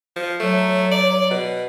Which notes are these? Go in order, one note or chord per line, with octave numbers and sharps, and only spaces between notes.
F3
F#3 A3
D5
B2